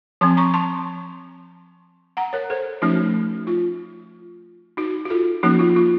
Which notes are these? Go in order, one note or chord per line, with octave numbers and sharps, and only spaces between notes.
F3 C4 A5 C6
A#5 C#6
A5 C6
F#5 A#5
A#4 C#5
A4 C5
F3 A3 C#4 D#4 F#4
F4
D#4 F#4
F#4
F4 A4
F3 A#3 C#4 D#4 F#4
F4
F4